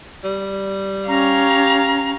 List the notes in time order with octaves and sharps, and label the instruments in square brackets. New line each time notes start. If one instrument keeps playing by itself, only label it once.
[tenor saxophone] G3
[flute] C#4 [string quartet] G4 F5 C#6 [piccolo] A#5